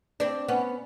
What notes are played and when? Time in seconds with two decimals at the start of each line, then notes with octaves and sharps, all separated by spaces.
0.20 C4 D4
0.48 B3 C#4